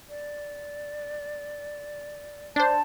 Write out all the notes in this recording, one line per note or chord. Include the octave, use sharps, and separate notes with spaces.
D5
D4 C5 A5